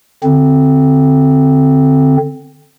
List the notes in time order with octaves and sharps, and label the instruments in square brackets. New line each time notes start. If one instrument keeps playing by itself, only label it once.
[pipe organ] D3 C4